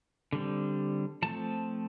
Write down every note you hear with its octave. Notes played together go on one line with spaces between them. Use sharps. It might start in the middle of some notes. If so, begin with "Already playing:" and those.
D3 G3 C4
F3 A3 C4 A5